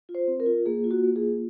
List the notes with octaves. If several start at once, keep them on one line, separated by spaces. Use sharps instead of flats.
F4
C5
C4
A#4
F4
A#3 G#4
F4
F#4
A#3
G#4
F4